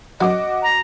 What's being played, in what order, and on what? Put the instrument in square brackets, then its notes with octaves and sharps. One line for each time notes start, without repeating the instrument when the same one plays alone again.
[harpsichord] F#2 F#3 [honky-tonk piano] F#4 D6 [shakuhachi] D#5
[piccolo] A#5